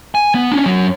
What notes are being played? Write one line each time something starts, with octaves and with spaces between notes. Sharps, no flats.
G#5
B3
C#4 D4
F#2 F#3